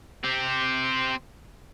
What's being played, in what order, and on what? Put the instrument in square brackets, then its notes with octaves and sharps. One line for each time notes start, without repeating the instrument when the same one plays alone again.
[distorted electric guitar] C4 G4